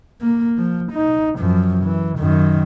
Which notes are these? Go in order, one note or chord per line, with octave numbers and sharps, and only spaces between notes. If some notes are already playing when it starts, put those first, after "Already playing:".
A#3
F3
D#4
F#2 F3
E3
F#2 D#3